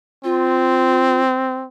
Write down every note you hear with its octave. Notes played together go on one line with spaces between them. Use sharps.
C4 F4